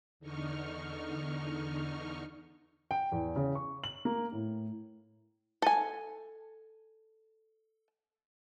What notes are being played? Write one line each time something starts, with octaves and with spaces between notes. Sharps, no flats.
E2 D3 D#4 C#6 F6
G5
E2
C#3
C#6
F#7
A#3
A2
A4 G#5